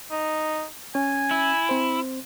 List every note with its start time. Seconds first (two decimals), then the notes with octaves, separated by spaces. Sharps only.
0.11 D#4
0.95 C#4 G#5
1.31 E4
1.69 C4 C5